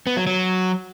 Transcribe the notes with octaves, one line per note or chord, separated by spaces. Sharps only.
B3
F#3
F#3